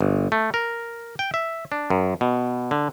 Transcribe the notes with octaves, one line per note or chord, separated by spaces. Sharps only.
G1
A3
A#4
G5
E5
D4
F#2
B2
D3